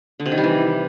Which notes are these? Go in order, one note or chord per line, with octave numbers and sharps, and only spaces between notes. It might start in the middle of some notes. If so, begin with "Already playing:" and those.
D3
C3
D#3
G3
E3